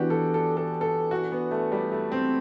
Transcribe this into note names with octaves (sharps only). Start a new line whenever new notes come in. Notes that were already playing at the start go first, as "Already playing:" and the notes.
Already playing: E3 B3 D4 F#4 G4
A4
A4
A4
A4
F#4
B3
A3
G3
A3
C4